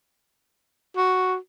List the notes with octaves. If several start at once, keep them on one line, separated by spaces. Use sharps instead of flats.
F#4